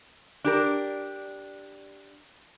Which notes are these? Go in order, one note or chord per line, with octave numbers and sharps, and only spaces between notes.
D4 G4 A#4